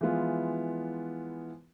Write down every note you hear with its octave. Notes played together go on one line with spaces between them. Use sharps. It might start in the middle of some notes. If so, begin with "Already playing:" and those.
E3 F3 G#3 B3 E4 F4